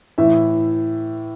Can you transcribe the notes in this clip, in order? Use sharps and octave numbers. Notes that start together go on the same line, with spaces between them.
A2 E3 E5